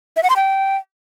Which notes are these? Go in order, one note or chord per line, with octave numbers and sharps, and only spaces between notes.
E5
F#5
C6
G5